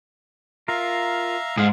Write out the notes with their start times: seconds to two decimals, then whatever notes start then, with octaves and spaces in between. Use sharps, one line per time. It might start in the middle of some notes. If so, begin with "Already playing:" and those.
0.68 F4 A#4 E5 F5 A#5
1.57 G#2 G#4 F5